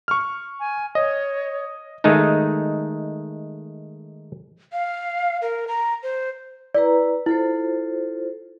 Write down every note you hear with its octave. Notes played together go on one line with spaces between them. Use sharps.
C#6 F6
G#5
C#5 D#5
D#3 G#3 A3 D#4
F5
A#4
A#5
C5
E4 B4 D5 A#5
E4 F4 A4 C5